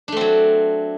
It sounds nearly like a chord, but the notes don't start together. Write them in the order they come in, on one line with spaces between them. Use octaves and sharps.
D4 A3 C4 F#3